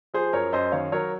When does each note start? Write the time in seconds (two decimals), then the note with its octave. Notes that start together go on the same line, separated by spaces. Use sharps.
0.14 F3 G#4 C5
0.33 F#2 A#4 C#5
0.53 F#2 C5 D#5
0.72 D#3 C#5 F5
0.92 F#3 A#4 C#5